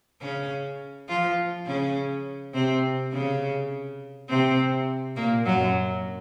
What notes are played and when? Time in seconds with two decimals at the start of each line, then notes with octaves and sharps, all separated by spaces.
0.21 C#3 C#4
1.09 F3 F4
1.66 C#3 C#4
2.54 C3 C4
3.12 C#3 C#4
4.29 C3 C4
5.16 A#2 A#3
5.45 F#2 F#3